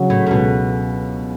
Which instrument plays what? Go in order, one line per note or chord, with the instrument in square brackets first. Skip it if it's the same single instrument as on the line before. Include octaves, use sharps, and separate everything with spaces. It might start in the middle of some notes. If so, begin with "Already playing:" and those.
Already playing: [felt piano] C#3 F#3
[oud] A2
A#2
[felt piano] C#2 [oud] B2